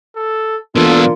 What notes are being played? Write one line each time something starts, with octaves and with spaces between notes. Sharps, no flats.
A4
B2 E3 A#3 D4 F4 A4 C6